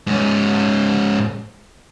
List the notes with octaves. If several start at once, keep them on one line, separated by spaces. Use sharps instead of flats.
G#2 C#4